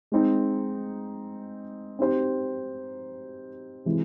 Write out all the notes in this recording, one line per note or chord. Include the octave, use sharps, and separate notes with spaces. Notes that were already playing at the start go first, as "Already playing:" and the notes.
G#3 C4 D#4
C4 D#4 G4 C5
C3 E3 G#3